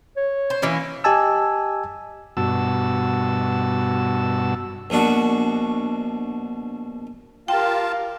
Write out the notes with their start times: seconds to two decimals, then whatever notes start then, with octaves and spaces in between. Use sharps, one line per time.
0.17 C#5
0.50 C5
0.62 E3 A#3 C#4
1.04 G4 D#5 G#5 A5 E6
2.37 G2 B2 F#4 A5 E6
4.90 A#1 B2 D4 F#4
7.48 F4 G4 A#4 F5 G5 A5